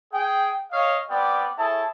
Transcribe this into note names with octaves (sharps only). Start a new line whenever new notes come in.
G#4 G5
C#5 D#5 F5
G3 B3 C4 D5 G5
E4 G#4 A4 C#5 A5